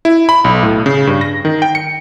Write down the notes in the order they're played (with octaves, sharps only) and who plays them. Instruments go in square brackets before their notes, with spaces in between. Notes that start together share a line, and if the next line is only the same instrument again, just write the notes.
[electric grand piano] E4
B5
B1
A2
C#3
G2
A#6
D#3
G5
C#7